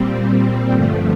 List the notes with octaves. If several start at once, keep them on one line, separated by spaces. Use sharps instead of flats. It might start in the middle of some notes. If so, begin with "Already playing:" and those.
Already playing: A#2 G3 C4
G2 D3 F3 A3